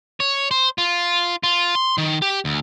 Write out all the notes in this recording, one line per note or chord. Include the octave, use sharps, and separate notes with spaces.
C#5
C5
F4
F4
C6
D#3
G4
D2